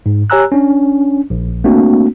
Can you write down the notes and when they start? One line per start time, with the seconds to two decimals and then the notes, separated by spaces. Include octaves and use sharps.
0.06 G#2
0.30 G4 C#5 G#5 A#5 E6 F#6
0.52 C#4 D4
1.30 A#1
1.64 A3 A#3 C4 D4 F#4